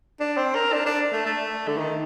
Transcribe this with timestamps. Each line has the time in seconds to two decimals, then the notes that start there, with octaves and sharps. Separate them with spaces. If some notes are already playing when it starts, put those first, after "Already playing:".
0.20 D4
0.37 C4
0.55 A#4
0.73 D4
0.86 D4
1.13 A3
1.26 A3
1.68 D3
1.78 D#3